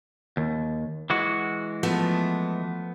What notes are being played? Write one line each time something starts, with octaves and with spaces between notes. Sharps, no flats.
D#2
E3 G#3 F#4
F3 A3 B3